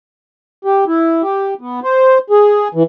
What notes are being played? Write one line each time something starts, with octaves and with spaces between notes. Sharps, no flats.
G4
E4
G4
B3
C5
G#4
E3